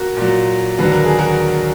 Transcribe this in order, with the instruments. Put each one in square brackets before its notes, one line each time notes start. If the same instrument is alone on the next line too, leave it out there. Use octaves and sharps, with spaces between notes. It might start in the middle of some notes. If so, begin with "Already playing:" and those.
Already playing: [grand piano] F#4 A#4
A#2 F#3
D#2 D3 F#3 B4
A#4
G#4
F#4 A#4